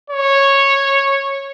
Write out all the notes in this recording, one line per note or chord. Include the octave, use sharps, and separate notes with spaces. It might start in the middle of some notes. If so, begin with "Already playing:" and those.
C#5